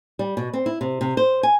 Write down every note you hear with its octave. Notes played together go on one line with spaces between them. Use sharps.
G3
B2
C4
E4
C3
C3
C5
G#5